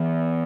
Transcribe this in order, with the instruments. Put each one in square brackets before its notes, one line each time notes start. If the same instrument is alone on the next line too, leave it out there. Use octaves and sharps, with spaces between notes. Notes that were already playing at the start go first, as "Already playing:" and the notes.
Already playing: [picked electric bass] E3 B3